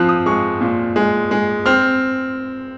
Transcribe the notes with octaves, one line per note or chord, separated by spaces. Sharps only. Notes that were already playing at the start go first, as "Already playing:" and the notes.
Already playing: F3 C4 F#6
D#6
G#3 C#6
A#2
G#3
G#3
C4 F6